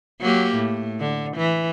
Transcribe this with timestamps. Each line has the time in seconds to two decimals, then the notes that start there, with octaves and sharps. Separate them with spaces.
0.21 F#3 A#3 G4
0.55 A2
1.00 D3
1.37 E3